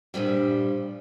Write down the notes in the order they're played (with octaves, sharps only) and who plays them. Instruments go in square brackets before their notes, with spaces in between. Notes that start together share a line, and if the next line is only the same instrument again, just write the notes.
[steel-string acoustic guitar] G2 A#2 F3 G3